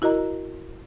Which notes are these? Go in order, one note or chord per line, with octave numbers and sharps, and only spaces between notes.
E4 F#4 A#4 D#5 A#5